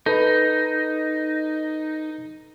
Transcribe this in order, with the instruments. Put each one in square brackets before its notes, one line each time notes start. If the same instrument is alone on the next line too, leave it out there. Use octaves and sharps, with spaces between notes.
[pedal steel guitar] D#4 [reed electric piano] A4 B4